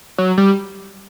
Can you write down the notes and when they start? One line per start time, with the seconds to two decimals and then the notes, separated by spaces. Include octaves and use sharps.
0.18 F#3
0.38 G3